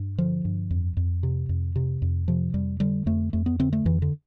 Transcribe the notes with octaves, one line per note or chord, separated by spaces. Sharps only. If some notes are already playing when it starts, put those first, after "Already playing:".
Already playing: G2
D3 F3
G2
F2
F2
C3
F2
C3
F2
C3 F3
F2 G3
D3 G3
F2 A3
F2 A3
B3
D3 C4
A3
F2 E3
D3